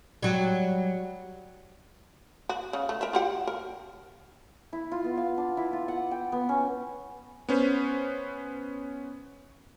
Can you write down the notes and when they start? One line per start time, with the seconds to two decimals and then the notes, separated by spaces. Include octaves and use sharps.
0.23 F#3 G3
2.49 F#4
2.73 C#3
2.89 A3
3.01 A#4 E5
3.13 F4 G4 F#5
3.47 A#4
4.73 E4
4.92 F4
5.04 B3
5.18 F5
5.38 D4
5.57 E4
5.73 F4
5.88 F#5
6.11 G5
6.32 B3
6.49 C#4
7.49 B3 C#4 B4 C5